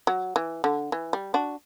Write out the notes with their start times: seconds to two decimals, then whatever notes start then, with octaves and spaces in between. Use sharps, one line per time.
0.07 F#3
0.36 E3
0.64 D3
0.92 E3
1.13 G3
1.34 D4 F#4